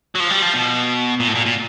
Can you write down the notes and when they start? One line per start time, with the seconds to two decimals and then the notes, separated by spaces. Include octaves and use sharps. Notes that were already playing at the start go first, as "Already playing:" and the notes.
0.15 F#3
0.20 F3
0.31 G3
0.42 F3
0.54 B2
1.20 A#2
1.28 A2
1.35 A#2
1.46 A#2